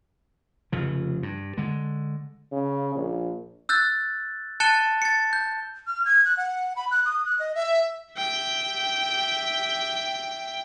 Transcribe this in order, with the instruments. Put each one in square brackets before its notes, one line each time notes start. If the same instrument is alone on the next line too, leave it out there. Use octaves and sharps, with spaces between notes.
[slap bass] F1 C#3 F3
G2
D3 G#3
[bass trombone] C#3
A#1
[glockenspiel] E6 F#6 G6 A6
A5 F#6 A6 C#7 E7 G7
A6 C#7
G6
[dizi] F6
G#6
F#6
F#5
B5
F#6
D#6
F#6
D#5
E5
[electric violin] E5 G5